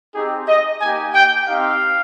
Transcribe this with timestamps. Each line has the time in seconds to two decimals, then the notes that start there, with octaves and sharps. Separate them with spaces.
0.14 C4 D#4 G4 G#4
0.48 D#5
0.82 A#3 D#4 G4 G#5
1.15 G5
1.48 C4 D#4 G4 F5